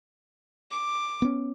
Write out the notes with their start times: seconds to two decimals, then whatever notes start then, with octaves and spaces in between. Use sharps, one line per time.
0.71 D6
1.22 B3 C#4